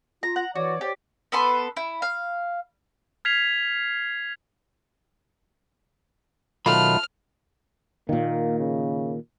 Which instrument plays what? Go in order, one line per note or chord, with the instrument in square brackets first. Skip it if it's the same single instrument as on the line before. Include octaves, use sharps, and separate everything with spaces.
[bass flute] F4 [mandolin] A#5
[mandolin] F#5 A#5
[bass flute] E3 [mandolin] F#4 [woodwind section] C#5 D5
[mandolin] G4 [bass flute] C5
[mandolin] B3 A4 B4 C6
E4
F5
[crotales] F6 G#6 B6 C7 F7
[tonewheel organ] B2 D#3 F#3 [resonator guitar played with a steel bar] A3 F4 [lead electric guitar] B5 [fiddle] F6
[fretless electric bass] A#2 D#3 [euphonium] A#3
[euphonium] C#3